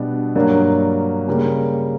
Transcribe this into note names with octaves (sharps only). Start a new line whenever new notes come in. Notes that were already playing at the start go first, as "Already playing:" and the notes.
Already playing: B2 G3 B3 D4
G2 F#3 A#3 D4
C#3 G3 A#3